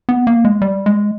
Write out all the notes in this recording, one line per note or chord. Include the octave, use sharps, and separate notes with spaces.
B3
A#3
G#3
G3
G#3